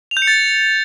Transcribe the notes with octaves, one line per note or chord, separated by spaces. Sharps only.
F7
G6
C#7
A6